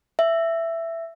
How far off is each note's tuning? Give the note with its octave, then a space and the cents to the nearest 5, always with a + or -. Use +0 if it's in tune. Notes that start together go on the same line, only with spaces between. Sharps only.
E5 +10